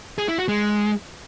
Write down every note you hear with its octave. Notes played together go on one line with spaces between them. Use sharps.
G#4
E4
F#4
G#3